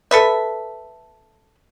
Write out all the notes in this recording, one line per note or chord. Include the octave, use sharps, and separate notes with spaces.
A4 B4 E5